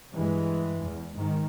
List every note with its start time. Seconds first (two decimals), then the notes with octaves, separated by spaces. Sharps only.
0.12 G2 E3 G#3
0.82 E2
1.14 G#2 D#3